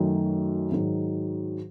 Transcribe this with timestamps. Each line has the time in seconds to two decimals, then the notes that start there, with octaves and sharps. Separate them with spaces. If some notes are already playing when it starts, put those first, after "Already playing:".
Already playing: F#2 D#3 F#3 A3
0.72 G#2 D#3 F#3